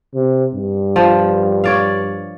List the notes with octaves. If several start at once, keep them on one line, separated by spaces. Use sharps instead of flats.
C3
G2
F3
C#5 D5 F5